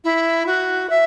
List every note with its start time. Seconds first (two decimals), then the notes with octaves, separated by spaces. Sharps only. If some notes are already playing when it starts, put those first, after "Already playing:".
0.04 E4
0.46 F#4
0.90 E5